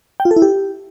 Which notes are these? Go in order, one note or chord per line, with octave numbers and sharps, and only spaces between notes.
G5
F4
A4
E4
G4